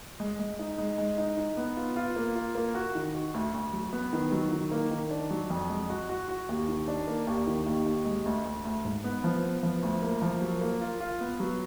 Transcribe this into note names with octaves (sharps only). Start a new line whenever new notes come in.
G#3
G#3
D#4
G#3
G#3
D#4
D#4
B3
F4
F4
A#3
F4
A#3
F#4
D#3
F#4
D2
D2
F#3
B3
D#3
F#3
D#3
A#3
D#3
D4
F#3
F2
G#3
F#4
F#4
F#4
D#2
D#3
D4
A#3
D#2
D#3
D#2
D#2
G#3
D2
D2
D2
G#2
B3
F3
B3
F3
D2
A#3
F3
F#3
A#3
F4
F4
B3
F#3